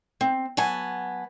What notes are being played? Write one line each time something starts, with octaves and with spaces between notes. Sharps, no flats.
C4
F#3 B3 G#5 A5